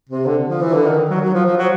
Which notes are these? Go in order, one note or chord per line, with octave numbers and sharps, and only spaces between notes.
C3
D3
F3
E3
D3
D#3
F#3
F#3
F3
F3
F#3